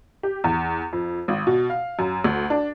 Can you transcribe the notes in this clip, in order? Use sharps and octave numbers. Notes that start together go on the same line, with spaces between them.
G4
E2
F2
G#1
B2
F5
F#2
D2
D4